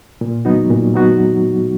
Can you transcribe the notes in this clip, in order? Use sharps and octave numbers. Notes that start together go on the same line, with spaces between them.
A#2
F#3 B3 D#4 F#4
A#2
F#3 B3 D#4 F#4